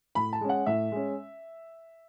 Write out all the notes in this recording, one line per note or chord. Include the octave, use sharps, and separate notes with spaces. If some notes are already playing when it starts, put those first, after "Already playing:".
A2 B5
A5
G#3 C#4
F#5
A2 E5
G#3 C#4